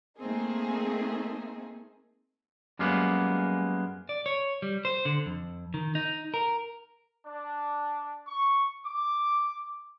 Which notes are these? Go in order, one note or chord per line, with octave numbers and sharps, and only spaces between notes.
A3 A#3 C4 D#4 G#4
F#2 G3 G#3 A#3 B3
D5
C#5
G3
C5
D3
F2
D#3
D#4
A#4
D4
C#6
D6